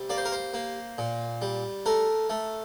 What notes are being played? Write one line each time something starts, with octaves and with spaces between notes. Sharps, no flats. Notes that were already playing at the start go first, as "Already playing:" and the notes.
Already playing: C3 G3
A#3 D5
C5
A#4
C5
A#3
A#2
G3
A3 A#4
A3